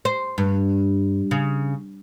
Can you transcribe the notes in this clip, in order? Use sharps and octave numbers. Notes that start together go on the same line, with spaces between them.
C5
G2
C#3